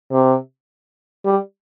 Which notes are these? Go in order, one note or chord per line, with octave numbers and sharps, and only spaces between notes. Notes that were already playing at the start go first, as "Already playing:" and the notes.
C3
G3